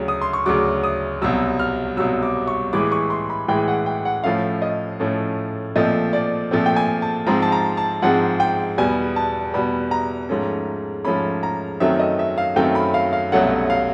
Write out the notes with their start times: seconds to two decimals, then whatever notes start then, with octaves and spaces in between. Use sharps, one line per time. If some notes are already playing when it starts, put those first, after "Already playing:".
Already playing: D2 C#3 F#3
0.08 D#6
0.21 C6
0.33 C#6
0.46 D2 C#3 F#3 D6
0.83 D#6
1.21 C2 B2 F#3 E6
1.59 F6
1.97 C2 B2 F#3 E6
2.23 D6
2.47 C#6
2.73 A2 E3 G#3 D6
2.92 C#6
3.10 C6
3.30 B5
3.48 A2 E3 G#3 G5
3.68 F#5
3.86 G5
4.05 F#5
4.24 A2 F3 A3 C#4 F5
4.62 D#5
5.00 A2 F3 A3 C#4
5.76 A#2 F3 A3 C4 D#5
6.13 D5
6.51 A#2 F3 A3 C4
6.66 G5
6.76 G#5
7.02 A5
7.26 G#2 F3 G#3 C4 A#5
7.42 A5
7.52 A#5
7.77 A5
8.02 G#2 F3 G#3 C4 F#5
8.40 G5
8.78 E2 B2 G3 B3 G#5
9.16 A5
9.54 E2 B2 G3 B3 B5
9.91 A#5
10.29 G#2 F3 A3 C#4
11.05 G#2 F3 A3 C#4 B5
11.43 A#5
11.80 F#2 D#3 F#3 A3 C4 E5
11.99 D#5
12.19 E5
12.38 F5
12.56 F#2 D#3 F#3 A3 C4 G5
12.75 B5
12.94 F5
13.13 F5
13.32 C2 B2 F#3 A3 C#4 F#5
13.70 F5